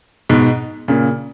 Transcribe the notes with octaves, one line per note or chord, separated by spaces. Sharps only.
G#2 B2
A#2 C#3